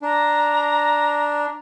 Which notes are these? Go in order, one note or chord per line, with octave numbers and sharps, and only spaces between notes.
D4 A#5